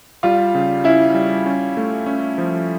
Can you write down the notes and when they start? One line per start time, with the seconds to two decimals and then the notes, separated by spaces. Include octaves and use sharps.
0.23 G3 F4
0.55 C#3
0.84 C#4 E4
1.14 G3
1.46 C#4
1.77 A3
2.06 C#4
2.38 F3